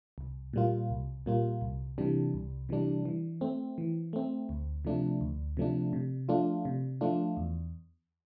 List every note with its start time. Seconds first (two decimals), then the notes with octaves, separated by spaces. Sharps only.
0.18 C2
0.54 A#2 G3 A#3 F4
0.90 C2
1.26 A#2 G3 A#3 F4
1.61 C2
1.98 C3 E3 G3 D4
2.34 C2
2.69 C3 E3 G3 D4
3.05 E3
3.41 A3 C4
3.78 E3
4.13 A3 C4
4.49 D2
4.85 C3 F3 A3 D4
5.21 D2
5.57 C3 F3 A3 D4
5.93 C3
6.29 F3 A3 D4 F4
6.65 C3
7.01 F3 A3 D4 F4
7.37 E2